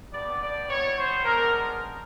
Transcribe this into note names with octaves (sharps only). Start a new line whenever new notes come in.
B3 D4 G4 D5
D5
G3 B3 E4 C#5
C5
G#3 B3 D4 A#4